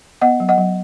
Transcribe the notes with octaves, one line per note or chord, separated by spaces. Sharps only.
B3 D#5 F#5
F#3
D#5 F#5
F#3